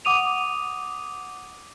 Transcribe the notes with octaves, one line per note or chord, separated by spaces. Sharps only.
F#5 D6 D#6 D#7 F7